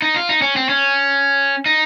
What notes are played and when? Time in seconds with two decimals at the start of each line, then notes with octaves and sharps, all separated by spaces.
0.02 D#4
0.16 F4
0.29 D#4
0.42 C#4
0.56 C4
0.69 C#4
1.66 D#4